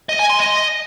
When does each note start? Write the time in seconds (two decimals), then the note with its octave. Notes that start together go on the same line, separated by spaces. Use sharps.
0.09 D#5
0.19 G#5
0.30 C6
0.40 D#5